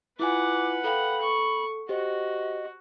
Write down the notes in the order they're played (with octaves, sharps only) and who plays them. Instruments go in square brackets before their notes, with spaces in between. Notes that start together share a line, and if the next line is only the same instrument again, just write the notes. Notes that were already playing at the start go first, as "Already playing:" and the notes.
[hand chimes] E4 F4 G#5 [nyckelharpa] B4 F#5 [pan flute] D6
[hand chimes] A4 F5 G5 [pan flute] B5
[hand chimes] A4 [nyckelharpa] C#6
[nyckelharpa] F#4 [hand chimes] G4 C5 [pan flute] D#5